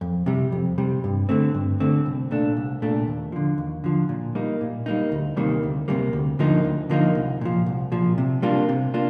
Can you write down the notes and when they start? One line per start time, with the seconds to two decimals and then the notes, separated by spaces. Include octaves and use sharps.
0.01 F2
0.26 C3 G3
0.52 F2
0.78 C3 G3
1.04 G2
1.29 D3 A3 C4
1.54 G2
1.80 D3 A3 C4
2.06 C2
2.31 A#2 A3 D4
2.57 C2
2.82 A#2 A3 D4
3.07 D#2
3.32 D3 F3
3.58 D#2
3.84 D3 F3
4.09 A#2
4.35 G3 A#3 D#4
4.61 A#2
4.86 G3 A#3 D#4
5.12 D2
5.37 C3 D#3 G3 A#3
5.63 D2
5.88 C3 D#3 G3 A#3
6.13 D2
6.39 D3 F3 A#3 D#4
6.65 D2
6.90 D3 F3 A#3 D#4
7.15 C2
7.41 A#2 F3
7.66 C2
7.92 A#2 F3
8.18 C3
8.42 G3 A#3 D4 F4
8.69 C3
8.94 A#3 D4 F4